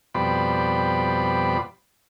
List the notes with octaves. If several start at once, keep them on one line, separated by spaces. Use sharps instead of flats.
F2 B2 G3 C5 D5 B5